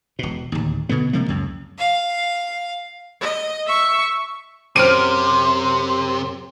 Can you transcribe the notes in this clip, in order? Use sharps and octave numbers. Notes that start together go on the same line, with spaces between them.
E1 B2
D1 D#2
B2 D3 B3
C3 F3 G#3 A#3
C#2 F#2
F5
D#5
E5 C#6
F#2 C3 C5 C6 F6 D7 D#7